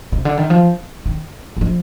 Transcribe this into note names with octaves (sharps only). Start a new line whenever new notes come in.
C3
D3
D#3
F3
D#3
G3
F3